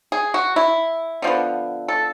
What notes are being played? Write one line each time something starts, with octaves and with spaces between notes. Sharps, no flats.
G#4
F#4
E4
D3 F3 G#3 B3
A4